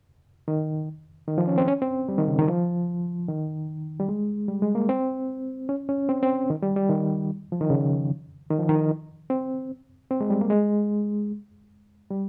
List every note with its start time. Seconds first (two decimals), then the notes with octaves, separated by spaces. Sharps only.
0.48 D#3
1.27 D#3
1.38 F3
1.48 C#4
1.58 C4
1.68 C#4
1.82 C4
2.08 G3
2.18 D#3
2.28 C#3
2.39 D#3
2.48 F3
3.28 D#3
4.00 G3
4.09 G#3
4.48 G3
4.62 G#3
4.75 A#3
4.89 C4
5.69 C#4
5.89 C#4
6.09 C4
6.23 C4
6.50 D#3
6.62 G3
6.76 G3
6.89 D#3
7.52 F3
7.61 D#3
7.70 C#3
8.51 D#3
8.59 F3
8.69 D#3
9.30 C4
10.11 C4
10.21 G#3
10.30 G3
10.41 A#3
10.50 G#3
12.11 G3